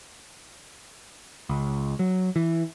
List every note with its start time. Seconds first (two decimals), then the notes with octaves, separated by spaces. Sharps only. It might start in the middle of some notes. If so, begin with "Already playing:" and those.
1.49 C#2
1.99 F#3
2.36 E3